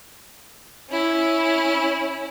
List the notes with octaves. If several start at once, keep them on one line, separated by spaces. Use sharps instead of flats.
C#4 E4